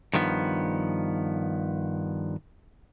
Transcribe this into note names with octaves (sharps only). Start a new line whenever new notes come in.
G2 D#3 F3 B3